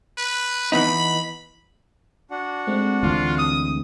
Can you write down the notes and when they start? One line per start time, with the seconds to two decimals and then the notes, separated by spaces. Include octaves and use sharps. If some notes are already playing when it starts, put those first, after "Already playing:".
0.18 B4
0.72 E3 B3 D#4 B5
2.31 D4 F#4 F#5
2.67 G#3 A3 C4
3.03 D2 E3 F4
3.38 D#6